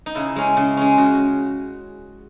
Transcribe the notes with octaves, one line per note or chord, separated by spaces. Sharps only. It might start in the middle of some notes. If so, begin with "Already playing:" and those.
D#4
C#3 E4
G#3 C#4
C#3
G#3 C#4
C#3 F#4